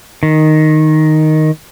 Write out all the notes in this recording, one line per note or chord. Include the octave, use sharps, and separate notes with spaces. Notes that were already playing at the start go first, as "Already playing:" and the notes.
D#3